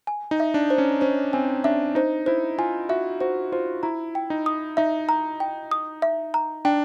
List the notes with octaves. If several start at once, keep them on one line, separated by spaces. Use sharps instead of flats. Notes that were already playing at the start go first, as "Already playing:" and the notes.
G#5
D#4
E5
D4
C5
C#4
C#4 C5
C4 G#5
D4 E5
D#4 C5
E4 C5
F4 G#5
F#4 E5
F#4 C5
F4 C5
E4 A#5
G5
D#4
D#6
D#4 E5
A#5
G5
D#6
E5
A#5
D4 G5